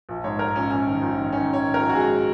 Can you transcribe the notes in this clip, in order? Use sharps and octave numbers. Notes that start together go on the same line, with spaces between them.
A#1
G#2 C#5
G#2 A#4
A#1 C#4
A#1 C#4
D#3
A#1
D#3
D#3 C#4
A#1
C#5
D#3
A#4
A#1
F#4
G#2 G#4